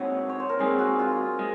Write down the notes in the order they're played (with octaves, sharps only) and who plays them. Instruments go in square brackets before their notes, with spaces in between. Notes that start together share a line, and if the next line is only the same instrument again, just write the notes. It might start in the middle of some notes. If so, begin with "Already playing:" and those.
Already playing: [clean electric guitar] A#2 G#3 C4 D#4 F#4 [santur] C#5
[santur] C#5
C5
A#4
[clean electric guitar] A#2 G#3 C4 D#4 [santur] G#4
[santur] F#4
F4
[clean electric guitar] G#3